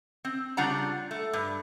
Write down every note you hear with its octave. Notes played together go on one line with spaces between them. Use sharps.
C4
C#3 G3 D4 F4 F#5 A#5
A3
G2